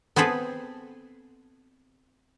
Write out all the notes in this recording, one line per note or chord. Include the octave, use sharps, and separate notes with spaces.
B3 C4 G#4 A4 B4